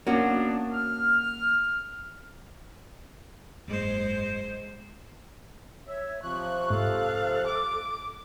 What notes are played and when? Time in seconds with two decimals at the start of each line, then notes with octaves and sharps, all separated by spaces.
0.07 A#3 B3 C#4 D4 F#4
0.73 F6
3.68 F#1 G#2 G#3 C5
5.87 C#5 E5
6.23 C3 F3 C#6 F#6
6.70 G#2 A4 F5
7.47 D6